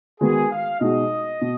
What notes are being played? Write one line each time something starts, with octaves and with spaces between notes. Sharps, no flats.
D#3 G#3 B3 D#4 F#4 G#4
F5
B2 G#3 D#4 F#4 D#5
B2